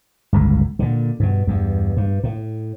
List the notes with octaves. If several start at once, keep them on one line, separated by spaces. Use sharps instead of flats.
G1 C#2 A2
A#2 D3
G2 B2
E2 G2
G2
A2